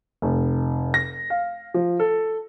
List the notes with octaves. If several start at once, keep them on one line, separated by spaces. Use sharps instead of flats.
F1
A#6
F5
F3
A4